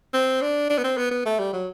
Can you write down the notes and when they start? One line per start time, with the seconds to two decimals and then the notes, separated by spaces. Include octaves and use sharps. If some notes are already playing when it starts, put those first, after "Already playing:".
0.14 C4
0.42 D4
0.70 D4
0.78 B3
0.84 C4
0.97 B3
1.11 B3
1.26 A3
1.39 G3
1.53 F#3